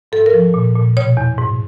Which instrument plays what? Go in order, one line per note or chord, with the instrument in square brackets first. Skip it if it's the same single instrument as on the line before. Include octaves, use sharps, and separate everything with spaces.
[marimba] G#2 A4
A#4
F3
A#2
A#2
B2 C#5
E2
G#2